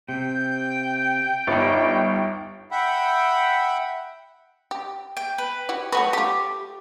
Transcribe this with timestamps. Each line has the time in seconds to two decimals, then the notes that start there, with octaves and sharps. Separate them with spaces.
0.09 C3 G5 G6
1.47 G1 G2 D#4 D5
2.71 E5 F#5 G5 B5
4.71 G4
5.17 G5
5.38 B4
5.69 E4 F#4 G4
5.92 F#3 A3 F#4 B4
6.13 A3 F4 G4